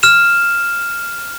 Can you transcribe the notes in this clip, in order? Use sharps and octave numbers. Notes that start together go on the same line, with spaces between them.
F6 E7